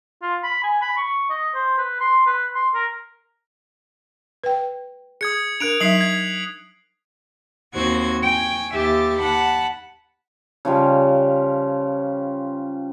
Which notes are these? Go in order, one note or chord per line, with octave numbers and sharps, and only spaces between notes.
F4
B5
G#5
B5
C#6
D#5
C5
B4
C6
B4
C6
A#4
B4 G5
G#4 D#6 G#6 C#7
D4 A#4 F#6 D7 F7
F#3 D#4 E5 B6 C7 F#7
G#6 C7
D#2 C4 F#4 C5 G#6
G5 G#5 C#6
D#2 G4 E5 A6
F#5 A5 B5
C#3 F3 G3